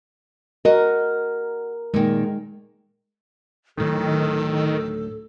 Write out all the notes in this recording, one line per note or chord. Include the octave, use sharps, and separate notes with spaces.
F#4 A#4 D#5
A#2 D#3 G#3
D2 A2 D#3 F#3 A4